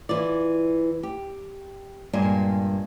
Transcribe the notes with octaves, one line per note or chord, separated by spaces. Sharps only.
E3 E4 F4 D5
G4
G2 A#2 G#3 G#5